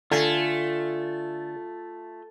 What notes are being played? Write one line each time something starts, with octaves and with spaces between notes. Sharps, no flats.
D3 A3 F4 G#5